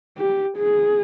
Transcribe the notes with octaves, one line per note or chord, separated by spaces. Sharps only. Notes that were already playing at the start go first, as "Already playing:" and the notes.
G4
G#4